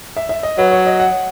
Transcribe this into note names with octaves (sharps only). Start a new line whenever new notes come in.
E5
E5
D#5
F#3 B4
C#5
D#5
F#5